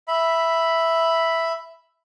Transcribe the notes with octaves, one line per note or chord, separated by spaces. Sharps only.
E5 B5